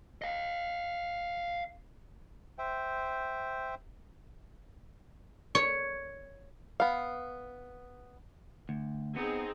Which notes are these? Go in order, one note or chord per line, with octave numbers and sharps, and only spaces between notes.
D#5 F5
C5 E5 G5
C#5
B3 F5
D2
B3 C4 D#4 G#4